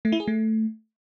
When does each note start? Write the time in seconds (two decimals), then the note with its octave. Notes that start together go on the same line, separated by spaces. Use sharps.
0.05 A3
0.12 E4
0.20 G#4
0.28 A3